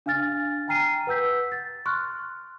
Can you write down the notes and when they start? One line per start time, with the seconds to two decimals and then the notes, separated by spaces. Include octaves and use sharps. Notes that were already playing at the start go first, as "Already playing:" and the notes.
0.06 D4 F5 G#5 F6 A6
0.68 G5 G#5 A#5 F6 C7 D#7
1.07 B4 F#5 E6 G6 B6
1.52 A6
1.85 C6 C#6 F6 F#6